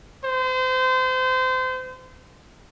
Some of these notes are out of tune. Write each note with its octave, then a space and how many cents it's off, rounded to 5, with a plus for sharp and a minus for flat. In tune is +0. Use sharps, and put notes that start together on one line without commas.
C5 -30